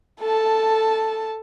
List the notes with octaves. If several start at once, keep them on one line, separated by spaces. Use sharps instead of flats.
A4 A5